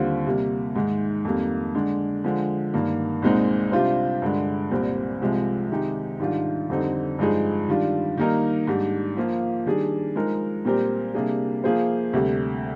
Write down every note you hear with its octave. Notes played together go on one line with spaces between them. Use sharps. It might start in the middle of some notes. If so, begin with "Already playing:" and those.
Already playing: D#2 D3 G3 C4 F4
C3 G3 A#3
G#2 D#3 G#3
F2 D#3 G3 A#3
D3 G#3 D4
D3 F3 G#3
G2 D#3 A#3
C2 A#2 G#3 C4 D#4
C3 G3 D4 F4 C5
G2 D3 G#3
C2 A#2 G3 C4
C2 C3 F3 G#3
C3 D#3 G#3 D#4 G4
G#2 D#3 G3 D4 F4
F2 D3 G3 C4 D#4
G2 F3 G#3 D#4 G#4
D#3 G3 D4 F4
D#3 G3 A#3 D#4 A#4
G#2 G3 D4
F3 A#3 F4
D#3 G3 D4 G#4
F3 G#3 D#4 A#4
A#2 G3 C4 G4 A#4
C3 G3 A#3 D4 G#4
F3 A#3 F4 G#4 C5
D2 C3 G3